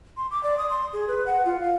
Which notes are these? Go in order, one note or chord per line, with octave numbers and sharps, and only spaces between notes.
C6
D6
D5
D#6
C6
G#4
B4
F#5
F4
F5